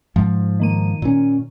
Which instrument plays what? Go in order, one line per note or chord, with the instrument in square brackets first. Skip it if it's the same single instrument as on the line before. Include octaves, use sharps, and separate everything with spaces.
[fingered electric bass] G#2 F3
[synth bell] D#3 A#3 D#7
[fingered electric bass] A#2 C#4